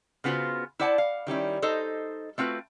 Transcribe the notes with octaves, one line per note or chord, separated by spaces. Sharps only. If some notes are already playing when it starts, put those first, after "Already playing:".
C#3 B3 F4 F#4 C5
E4 C5 D5 F#5 G5 A5
F5
D#3 G3 C#4 E4
D#4 A4 C5 D#5
A3 C4 F4 F#4 B4